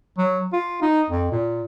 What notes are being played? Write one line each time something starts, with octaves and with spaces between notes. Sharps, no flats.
F#3
F4
D#4
F2
A#2